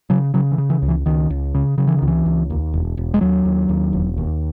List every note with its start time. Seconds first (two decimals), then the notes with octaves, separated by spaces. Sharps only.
0.10 C#3 F#3
0.34 C#3 F#3
0.52 E3
0.58 C#3
0.70 E3
0.82 C#2
0.88 E3
1.06 C#2 D#3
1.30 C#2
1.54 C#3
1.78 C#3 F#3
1.87 E3
1.97 D#3
2.02 C#2
2.08 E3
2.26 C#2
2.50 D#2
2.74 E1
2.97 E1
3.14 G#3
3.21 D#2 F#3
3.45 D#2
3.69 D#2
3.93 E1
4.17 D#2